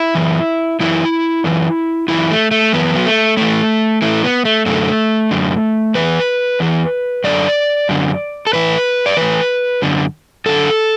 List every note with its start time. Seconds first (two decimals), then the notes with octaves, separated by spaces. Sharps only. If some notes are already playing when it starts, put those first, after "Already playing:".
Already playing: E4
0.15 F#2 E3
0.80 F#2 E3 E4
1.44 F#2 E3
2.08 F#2 E3 E4
2.31 A3
2.51 A3
2.73 F#2 E3 B3
2.96 F#3
3.06 A3
3.37 A2 E3 A3
4.02 A2 E3 A3
4.24 B3
4.45 A3
4.66 F#2 D3 A3
5.31 F#2 D3
5.95 E2 E3 B4
6.60 E2 E3
7.24 F#2 D3 D5
7.89 F#2 D3
8.47 A4
8.53 A2 E3 B4
9.06 D5
9.17 A2 E3 B4
9.82 F#2 D3
10.46 F#2 D3 A4